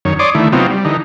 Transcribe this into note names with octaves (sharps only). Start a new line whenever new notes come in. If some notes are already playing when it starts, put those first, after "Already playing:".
F#2 D#3 C#5
C#5 D5 C6 D6 D#6
D3 D#3 A3 E4
C3 F#3 B3 C4 D#4 F4
G3
D3 E3 D#4